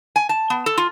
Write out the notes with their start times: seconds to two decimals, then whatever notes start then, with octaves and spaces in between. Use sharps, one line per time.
0.16 G#5
0.29 A5
0.50 B3
0.66 A4
0.77 F4